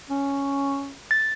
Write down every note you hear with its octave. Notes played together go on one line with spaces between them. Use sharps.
C#4
A6